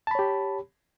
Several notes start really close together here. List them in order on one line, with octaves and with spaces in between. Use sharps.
A5 B5 C#5 G4